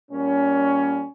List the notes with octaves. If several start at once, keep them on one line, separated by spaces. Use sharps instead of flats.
A#2 G3 A#3 C#4